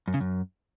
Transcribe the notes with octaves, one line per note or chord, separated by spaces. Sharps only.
F#2
C#3
F#2